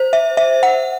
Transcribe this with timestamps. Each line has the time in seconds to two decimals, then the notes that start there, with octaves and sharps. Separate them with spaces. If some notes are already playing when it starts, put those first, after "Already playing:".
Already playing: C5
0.13 E5
0.37 E5
0.63 F#5